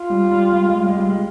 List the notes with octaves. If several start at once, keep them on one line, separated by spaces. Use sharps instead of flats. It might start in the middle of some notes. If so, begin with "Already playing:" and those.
Already playing: F4
G3
G3
G3
G#3
G3
G#3
G3
G#3